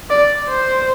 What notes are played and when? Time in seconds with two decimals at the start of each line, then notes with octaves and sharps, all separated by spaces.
0.10 D5
0.50 C5